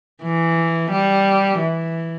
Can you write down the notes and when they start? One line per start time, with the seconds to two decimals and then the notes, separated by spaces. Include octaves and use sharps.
0.23 E3
0.90 G3
1.59 E3